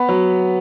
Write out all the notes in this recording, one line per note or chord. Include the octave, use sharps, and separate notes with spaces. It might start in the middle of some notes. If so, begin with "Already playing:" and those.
Already playing: B3 B5
F#3